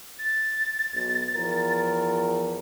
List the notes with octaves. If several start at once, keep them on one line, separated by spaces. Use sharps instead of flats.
A6
B1
E2 F3 A#4